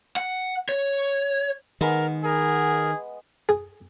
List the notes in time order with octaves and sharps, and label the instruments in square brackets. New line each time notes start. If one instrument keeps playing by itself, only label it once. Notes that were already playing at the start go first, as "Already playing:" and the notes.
[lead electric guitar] F#5
C#5
[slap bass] D#3 [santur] G#3 B3 [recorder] A#4
[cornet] G#4 [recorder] A#4
[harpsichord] G#4